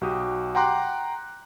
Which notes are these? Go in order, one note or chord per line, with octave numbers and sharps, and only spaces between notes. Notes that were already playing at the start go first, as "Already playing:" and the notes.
B1 F#4 G4 D#6
F#5 G5 A#5 C6 D6 F#6